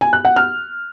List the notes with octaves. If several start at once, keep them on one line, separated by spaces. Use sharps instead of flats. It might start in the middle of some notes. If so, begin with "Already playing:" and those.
G#5
F#6
F#5
F6